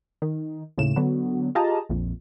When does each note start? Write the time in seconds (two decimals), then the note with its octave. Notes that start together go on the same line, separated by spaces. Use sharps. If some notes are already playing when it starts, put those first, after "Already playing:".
0.22 D#3
0.78 D#2 A2 C#3 E7
0.96 D3 F#3 B3
1.55 F4 G4 G#4 D#5 A5 A#5
1.89 A#1 F2 A#2